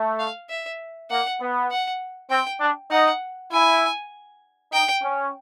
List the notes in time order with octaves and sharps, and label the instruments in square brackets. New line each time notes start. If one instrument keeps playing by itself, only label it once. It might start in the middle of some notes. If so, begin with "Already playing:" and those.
Already playing: [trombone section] A3
[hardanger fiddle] F5
E5
[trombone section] A#3 [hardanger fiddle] F#5
[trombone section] B3
[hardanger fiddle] F#5
[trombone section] C4 [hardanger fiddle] G5
[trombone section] D4
[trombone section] D#4 [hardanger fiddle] F#5
[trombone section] E4 [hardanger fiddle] G#5
[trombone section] D#4 [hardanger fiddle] G5
[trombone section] C#4